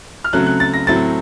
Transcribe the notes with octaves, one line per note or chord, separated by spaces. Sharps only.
F6
C#3 F#3 A3 C4 F#6
F#6
A6
A#6
A2 F#3 A3 C4 A6